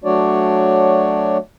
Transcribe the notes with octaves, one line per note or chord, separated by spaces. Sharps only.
F#3 A3 D4 F#4 C#5 D5